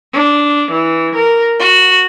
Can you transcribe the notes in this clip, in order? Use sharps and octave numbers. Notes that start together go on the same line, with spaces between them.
D4
E3
A#4
F#4